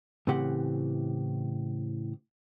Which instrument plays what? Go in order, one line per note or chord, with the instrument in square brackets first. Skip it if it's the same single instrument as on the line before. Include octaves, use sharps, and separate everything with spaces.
[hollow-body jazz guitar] A2 C#3 E3 C4 G4 F#5